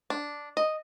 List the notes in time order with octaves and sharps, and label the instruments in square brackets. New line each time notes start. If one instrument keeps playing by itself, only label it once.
[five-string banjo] D4
D#5